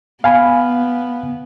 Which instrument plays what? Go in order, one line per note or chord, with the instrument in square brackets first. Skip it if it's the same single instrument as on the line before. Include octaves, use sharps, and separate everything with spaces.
[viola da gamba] B3 [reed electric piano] F5 G#5 B5